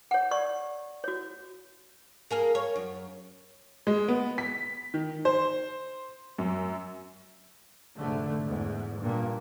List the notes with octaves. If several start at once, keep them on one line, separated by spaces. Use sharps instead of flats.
C#5 F#5
D5 C#6
F#4 C#5
A#3 G#4 A#4
C#5
F#2
G#3
B3
B6
D#3
C5
F#2
F1 G#2 D3 A3
E2 G#2
G2 A#2 A#3